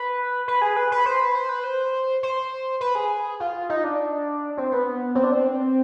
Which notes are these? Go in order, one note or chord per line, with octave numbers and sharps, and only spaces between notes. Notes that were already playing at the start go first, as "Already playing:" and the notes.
Already playing: B4
B4
G#4
B4
B4
C5
B4
C5
B4
C5
C5
B4
G#4
F4
D#4
D4
C4
B3
C4
D4
C4